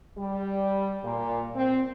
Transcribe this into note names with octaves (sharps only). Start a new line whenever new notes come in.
G3
A#2
C4